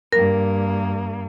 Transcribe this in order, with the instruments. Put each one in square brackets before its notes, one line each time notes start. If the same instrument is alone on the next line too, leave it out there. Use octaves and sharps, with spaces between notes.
[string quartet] G2 A#3 [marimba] A#4